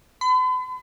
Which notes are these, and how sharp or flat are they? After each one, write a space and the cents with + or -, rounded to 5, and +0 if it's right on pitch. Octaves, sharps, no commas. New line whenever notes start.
B5 +45